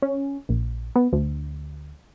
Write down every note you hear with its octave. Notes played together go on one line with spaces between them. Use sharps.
C#4
A#1
B3
D2